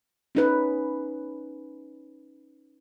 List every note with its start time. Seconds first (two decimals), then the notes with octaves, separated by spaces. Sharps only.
0.35 C#4 D#4 B4